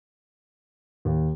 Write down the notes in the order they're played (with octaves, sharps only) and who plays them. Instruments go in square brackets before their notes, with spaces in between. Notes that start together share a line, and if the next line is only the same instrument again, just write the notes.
[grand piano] D#2